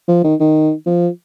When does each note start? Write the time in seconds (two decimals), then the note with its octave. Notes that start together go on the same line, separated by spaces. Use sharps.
0.08 F3
0.24 D#3
0.40 D#3
0.86 F3